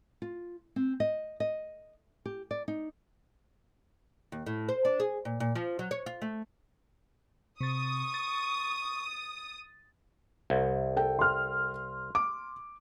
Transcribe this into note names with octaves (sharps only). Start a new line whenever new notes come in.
F4
C4
D#5
D#5
G4
D5
D#4
D#2
A2
C5
D4
G#4
A#2
A#2
F3
F#3
C#5
F4
A3
C3 C#6 D#6 A6
A6
C2
A4 G5
C6 F6
D6